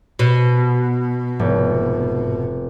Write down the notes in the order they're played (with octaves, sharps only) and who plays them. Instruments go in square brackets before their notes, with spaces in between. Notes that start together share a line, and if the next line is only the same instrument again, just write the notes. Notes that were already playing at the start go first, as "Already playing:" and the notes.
[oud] B2
[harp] F1 [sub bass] G#2